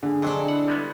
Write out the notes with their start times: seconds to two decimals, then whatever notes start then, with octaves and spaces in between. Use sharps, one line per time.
0.03 D3 G#4
0.22 F2 C3 F#3 D4 A4 D#5
0.48 E4 F#5
0.68 G3 G#3 B3